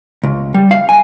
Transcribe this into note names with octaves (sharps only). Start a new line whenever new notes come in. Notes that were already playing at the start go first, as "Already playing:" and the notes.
C#2
G3
F5
G#5